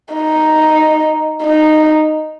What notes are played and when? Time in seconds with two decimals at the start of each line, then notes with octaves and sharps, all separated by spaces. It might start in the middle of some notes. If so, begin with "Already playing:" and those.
0.14 D#4
1.43 D#4